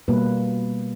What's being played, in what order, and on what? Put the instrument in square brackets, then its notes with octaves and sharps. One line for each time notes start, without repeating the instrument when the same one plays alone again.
[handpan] B2 G3 A#3 B4